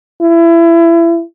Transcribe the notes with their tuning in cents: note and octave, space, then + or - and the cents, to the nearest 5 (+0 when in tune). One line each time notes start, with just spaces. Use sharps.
E4 +25